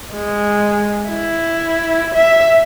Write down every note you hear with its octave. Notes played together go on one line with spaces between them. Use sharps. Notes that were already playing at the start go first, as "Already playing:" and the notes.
G#3
E4
E5